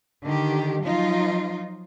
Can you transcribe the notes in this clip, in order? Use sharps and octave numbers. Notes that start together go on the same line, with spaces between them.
D3 D#3 G4
F3 F#3 D#4 F4